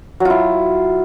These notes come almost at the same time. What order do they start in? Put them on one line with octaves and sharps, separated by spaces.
F#3 F4 E4